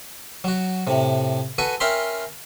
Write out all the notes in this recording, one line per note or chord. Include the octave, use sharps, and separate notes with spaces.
F#3 F#4
A2 C3
F#4 A4 B4 G#5
C#4 A#4 E5 G5 B5 C6